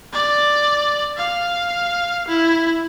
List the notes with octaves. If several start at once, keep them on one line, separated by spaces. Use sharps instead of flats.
D5
F5
E4